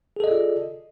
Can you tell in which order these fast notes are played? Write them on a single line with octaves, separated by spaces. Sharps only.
G#4 A4 D#5 D5 F4